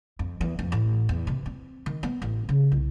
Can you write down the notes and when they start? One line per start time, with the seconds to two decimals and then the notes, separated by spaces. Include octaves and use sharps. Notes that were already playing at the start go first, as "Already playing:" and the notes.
0.19 F2
0.41 E2
0.59 F2
0.72 A1
1.09 E2
1.27 C3
1.46 C4
1.86 D#3
2.03 B3
2.22 A1
2.49 C#3
2.72 C2